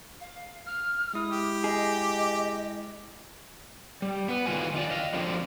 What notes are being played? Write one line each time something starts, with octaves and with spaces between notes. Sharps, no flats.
F5
F6
G#3 E4 D#6
G4
G#4 D#5
G3
B3 B4
A2 D#3 E3 F4 B4 G#5
D#3 F4 D5
D#5 F5
D3 F3 A#3 C4 D5